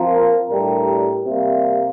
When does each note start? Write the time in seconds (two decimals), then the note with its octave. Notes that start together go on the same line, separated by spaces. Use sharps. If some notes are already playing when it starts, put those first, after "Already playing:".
Already playing: F3 C4 F4 A#4
0.49 A2 G3 D4 G4 A#4
1.25 C3 G3 A#3